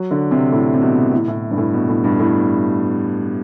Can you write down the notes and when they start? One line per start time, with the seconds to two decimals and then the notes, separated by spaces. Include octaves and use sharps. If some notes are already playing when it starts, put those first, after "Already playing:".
Already playing: F#3
0.11 D3
0.31 C3
0.52 A2
0.74 C3
0.81 B2
1.12 A2
1.28 A2
1.51 G2
1.58 A2
1.73 B2
1.89 A2
2.04 G2
2.19 A2